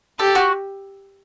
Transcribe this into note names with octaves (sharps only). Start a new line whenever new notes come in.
G4 A4
F#4